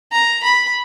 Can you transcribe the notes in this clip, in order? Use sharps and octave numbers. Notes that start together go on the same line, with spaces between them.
A#5
B5